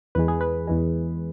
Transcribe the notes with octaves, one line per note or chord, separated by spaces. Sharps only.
E2 E3 G#3 B4
G#4
B4
E2 E3 G#3